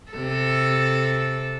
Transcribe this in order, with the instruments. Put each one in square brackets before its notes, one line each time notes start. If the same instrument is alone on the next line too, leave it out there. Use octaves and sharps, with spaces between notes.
[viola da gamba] C3 A4